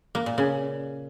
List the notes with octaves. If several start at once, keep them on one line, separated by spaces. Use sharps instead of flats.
A#3
A#2
C#3